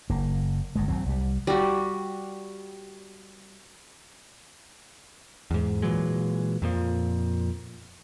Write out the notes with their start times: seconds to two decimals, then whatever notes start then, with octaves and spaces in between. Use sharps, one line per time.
0.10 F#1 A#3
0.76 G1 G2 G#3
0.88 G#1 F#3 C4
1.06 C2 G3
1.47 G3 F#4
5.51 E2 G#2
5.82 A#2 E3 F#3 G#3
6.62 F2 A#2 F3